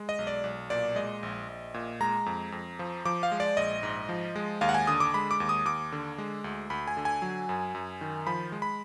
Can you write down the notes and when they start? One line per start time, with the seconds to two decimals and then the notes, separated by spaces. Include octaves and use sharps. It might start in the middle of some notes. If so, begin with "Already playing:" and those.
Already playing: G#3
0.09 D#5
0.19 B1
0.27 D5
0.44 B1
0.70 A#2 D5
0.96 G#3 D#5
1.23 A#1
1.48 A#1
1.74 A#2
2.00 G#3 A#5
2.26 F2
2.52 F2
2.79 F3
3.05 F3 D6
3.23 F5
3.32 G#3
3.40 D5
3.57 A#1 D#5
3.83 G#2
4.09 F3
4.35 G#3
4.61 D#2 F5
4.69 F#5
4.74 G#5
4.87 D3 D#6
5.00 D6
5.14 G#3 B5
5.31 D6
5.40 D#2
5.49 D#6
5.65 D#2 D6
5.92 D3
6.18 G#3
6.44 D2
6.70 D2 B5
6.87 G#5
6.97 D3
7.05 G#5
7.22 F#3
7.49 F#2
7.75 F#2
8.01 D#3
8.27 F3 B5
8.52 G#3
8.62 B5